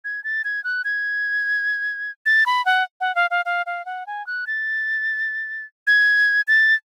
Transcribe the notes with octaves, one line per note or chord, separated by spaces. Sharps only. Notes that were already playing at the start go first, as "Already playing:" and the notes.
G#6
A6
G#6
F#6
G#6
A6
B5
F#5
F#5
F5
F5
F5
F5
F#5
G#5
F#6
A6
G#6
A6